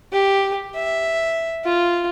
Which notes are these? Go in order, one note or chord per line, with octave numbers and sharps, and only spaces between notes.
G4
E5
F4